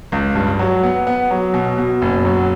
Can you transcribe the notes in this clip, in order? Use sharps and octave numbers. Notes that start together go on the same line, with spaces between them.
C#2
G2
F#3
B3
B3
F#3
B2
B2
F#1
F#3